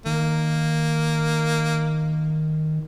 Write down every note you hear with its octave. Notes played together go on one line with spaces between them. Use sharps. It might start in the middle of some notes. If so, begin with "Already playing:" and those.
D#3 A#3